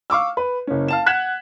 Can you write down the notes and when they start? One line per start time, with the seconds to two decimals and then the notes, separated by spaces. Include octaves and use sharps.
0.10 F5 C#6 D6 E6
0.37 B4
0.67 F#1 C#4
0.88 F5 A5 E7
1.06 F#5 F#6 G#6 B6 E7